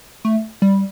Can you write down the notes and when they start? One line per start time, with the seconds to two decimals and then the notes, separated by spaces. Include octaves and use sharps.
0.25 A3
0.62 G3